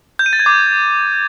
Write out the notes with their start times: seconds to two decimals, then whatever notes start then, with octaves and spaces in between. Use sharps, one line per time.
0.19 G6
0.26 D#7
0.33 A6
0.39 G#6
0.46 D6